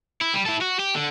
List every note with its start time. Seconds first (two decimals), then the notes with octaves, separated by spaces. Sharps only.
0.22 E4
0.34 G3
0.46 E4 A4
0.62 F#4
0.79 G4
0.95 D3